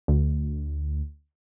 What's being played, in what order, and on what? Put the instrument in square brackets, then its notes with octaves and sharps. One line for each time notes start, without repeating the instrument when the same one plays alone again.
[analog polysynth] D2